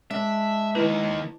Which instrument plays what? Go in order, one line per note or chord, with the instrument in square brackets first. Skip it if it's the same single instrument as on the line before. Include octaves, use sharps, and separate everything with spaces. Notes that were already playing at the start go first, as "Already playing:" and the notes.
[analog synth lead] G#3 [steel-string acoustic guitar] D4 [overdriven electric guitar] E5
[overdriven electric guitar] D#3 A#3 [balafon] E4 B4